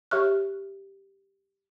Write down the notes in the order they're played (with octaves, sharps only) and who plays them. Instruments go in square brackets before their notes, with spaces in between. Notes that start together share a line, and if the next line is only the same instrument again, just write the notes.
[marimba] G4 C#5 E5 C#6 F6 F#6